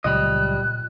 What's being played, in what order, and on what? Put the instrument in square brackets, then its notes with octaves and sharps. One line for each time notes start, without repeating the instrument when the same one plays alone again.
[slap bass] C#2 F#3 [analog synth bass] A#2 [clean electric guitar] G3 D#5 [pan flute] F#6